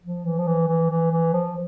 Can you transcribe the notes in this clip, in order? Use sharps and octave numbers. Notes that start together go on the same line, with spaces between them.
F3
E3
F3
E3
E3
E3
E3
F3